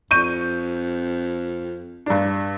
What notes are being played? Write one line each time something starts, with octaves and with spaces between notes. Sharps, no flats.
F2 C#6 G6 D#7
G2 D4